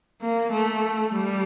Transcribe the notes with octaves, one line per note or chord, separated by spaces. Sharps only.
A#3
A3
G3